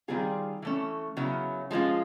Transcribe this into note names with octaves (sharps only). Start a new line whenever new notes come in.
D#3 G3 C4 F4 G#4
E3 A3 C#4
C#3 F#3 B3 E4
F3 G#3 C#4 F4